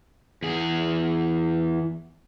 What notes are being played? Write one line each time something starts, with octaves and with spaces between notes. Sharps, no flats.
E2 G#4